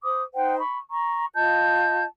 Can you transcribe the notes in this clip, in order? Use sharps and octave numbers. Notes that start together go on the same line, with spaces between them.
C5 D6 D#6
D#4 C5 F#5 G5
B5 C#6
A#5 C#6
F4 D#5 A5 G6